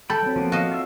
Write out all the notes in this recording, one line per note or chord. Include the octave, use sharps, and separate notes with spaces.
A4 G5 B5
F#3 C4
F3 A#3 B3
F#4 D#5 F5
F4 E5